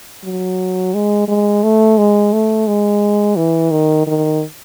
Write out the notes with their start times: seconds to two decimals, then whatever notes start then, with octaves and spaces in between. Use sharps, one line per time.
0.24 F#3
0.94 G#3
1.28 G#3
1.63 A3
1.98 G#3
2.33 A3
2.67 G#3
3.36 E3
3.71 D#3
4.07 D#3